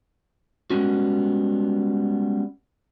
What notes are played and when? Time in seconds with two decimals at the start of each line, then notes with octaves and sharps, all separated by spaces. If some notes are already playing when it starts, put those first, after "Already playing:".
0.70 G3 G#3 B3 C#4 F#4